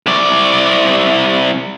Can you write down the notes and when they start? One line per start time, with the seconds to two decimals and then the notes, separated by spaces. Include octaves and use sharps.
0.06 C2 D5